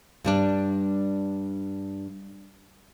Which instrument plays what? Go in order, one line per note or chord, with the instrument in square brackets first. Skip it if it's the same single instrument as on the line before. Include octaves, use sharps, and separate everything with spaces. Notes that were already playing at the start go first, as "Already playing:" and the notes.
[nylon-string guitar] G2 G3 D4